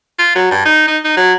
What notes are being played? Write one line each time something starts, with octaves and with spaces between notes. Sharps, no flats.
F4
F#3
G2
D#4
D#4
D#4
F#3